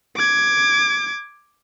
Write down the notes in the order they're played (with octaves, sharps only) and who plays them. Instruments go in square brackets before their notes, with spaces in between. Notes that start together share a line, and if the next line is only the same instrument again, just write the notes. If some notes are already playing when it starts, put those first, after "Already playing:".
[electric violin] D6 G#6